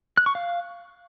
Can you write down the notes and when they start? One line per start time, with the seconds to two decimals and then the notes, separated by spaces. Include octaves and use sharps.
0.17 F#6
0.26 C#6
0.35 F5